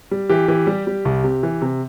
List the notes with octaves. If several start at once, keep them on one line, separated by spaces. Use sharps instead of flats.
G3
E3 G4
E3
G3
G3
C2
C3
E3
C3